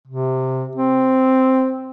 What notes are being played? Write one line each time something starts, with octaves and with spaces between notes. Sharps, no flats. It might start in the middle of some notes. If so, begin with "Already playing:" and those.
C3
C4